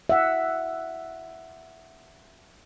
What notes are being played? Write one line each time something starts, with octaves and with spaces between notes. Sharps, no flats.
E5 F#5